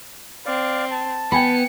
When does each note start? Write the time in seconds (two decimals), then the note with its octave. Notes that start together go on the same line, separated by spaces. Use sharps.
0.46 C4 D5 F5
0.91 A5
1.32 B3 G5 G#5 B5 C#7